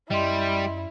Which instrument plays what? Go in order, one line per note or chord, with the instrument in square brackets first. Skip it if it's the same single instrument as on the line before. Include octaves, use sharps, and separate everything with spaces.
[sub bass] F#2 [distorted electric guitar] G3 [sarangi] E4 [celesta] D#5 C6